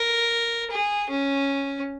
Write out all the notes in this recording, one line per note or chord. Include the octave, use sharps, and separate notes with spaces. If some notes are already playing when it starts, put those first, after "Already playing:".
Already playing: A#4
G#4
C#4